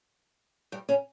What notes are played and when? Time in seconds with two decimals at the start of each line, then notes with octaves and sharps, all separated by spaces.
0.72 G2 G3
0.89 C#3 C#4